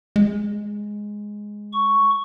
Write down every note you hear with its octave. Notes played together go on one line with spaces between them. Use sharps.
G#3
C#6